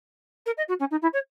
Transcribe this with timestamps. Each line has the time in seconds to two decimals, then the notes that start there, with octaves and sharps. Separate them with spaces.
0.46 A#4
0.58 D#5
0.69 F#4
0.80 C#4
0.91 D#4
1.02 E4
1.13 C#5